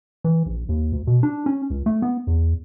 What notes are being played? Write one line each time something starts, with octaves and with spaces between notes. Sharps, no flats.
E3
A#1
D#2
D2
B2
D4
C#4
C#2
A3
B3
E2